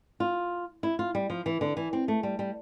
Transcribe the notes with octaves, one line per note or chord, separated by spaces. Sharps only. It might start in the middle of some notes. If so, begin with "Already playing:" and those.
F4
E4
F4
G3
F3
E3
D3
E3
C4
A3
G3
G3